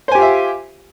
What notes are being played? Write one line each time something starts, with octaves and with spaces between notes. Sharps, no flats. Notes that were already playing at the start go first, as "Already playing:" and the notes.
F4 G4 C5 E5 G#5